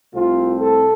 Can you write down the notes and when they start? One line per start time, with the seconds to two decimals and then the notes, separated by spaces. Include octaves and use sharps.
0.13 C2 C3 A3 C4 F4
0.59 A4